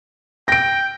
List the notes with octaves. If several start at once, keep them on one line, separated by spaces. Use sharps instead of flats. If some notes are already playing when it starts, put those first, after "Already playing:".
G5 A#6 D7